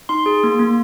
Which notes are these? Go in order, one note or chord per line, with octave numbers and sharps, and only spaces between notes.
D#4 C6
G#4
A#3
A#3